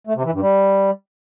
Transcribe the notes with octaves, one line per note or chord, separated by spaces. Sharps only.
A3
C3
E3
G2
G3